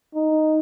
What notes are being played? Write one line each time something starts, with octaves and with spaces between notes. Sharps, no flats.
D#4